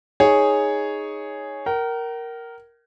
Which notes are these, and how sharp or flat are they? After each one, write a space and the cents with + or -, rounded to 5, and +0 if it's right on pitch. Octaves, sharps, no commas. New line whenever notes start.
D#4 +10 G#4 +0 C#5 +0
A#4 +0 G5 -45